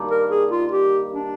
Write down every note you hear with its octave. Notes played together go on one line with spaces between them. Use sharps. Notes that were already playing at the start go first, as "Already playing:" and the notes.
Already playing: G2 D#3 G3 A#3
A#4
G#4
F4
G4
D4